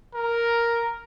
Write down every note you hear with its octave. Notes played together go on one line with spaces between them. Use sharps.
A#4